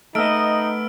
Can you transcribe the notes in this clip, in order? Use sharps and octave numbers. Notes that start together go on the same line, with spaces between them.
A3 B3 D#4 D#5 E6 F6 D7